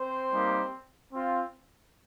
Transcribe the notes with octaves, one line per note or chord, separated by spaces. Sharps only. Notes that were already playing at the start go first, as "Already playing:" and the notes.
Already playing: C4 C5
G3 A#3 D#4 G4
C4 F4